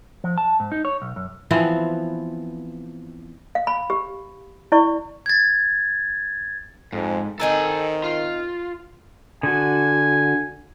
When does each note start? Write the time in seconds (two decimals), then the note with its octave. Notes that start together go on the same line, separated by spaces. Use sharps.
0.24 F3
0.38 A5
0.60 G#2
0.72 D#4
0.85 C#5
1.02 B1
1.16 F#2
1.51 E3 F3 B3 C4
3.55 F5
3.67 B5
3.90 G4
4.72 E4 D5 C#6
5.26 G#6 A6
6.93 F2 G#2
7.40 D#3 C4 D#4 A4 A#4 G#5
8.04 F4
9.43 D3 F#4 G#5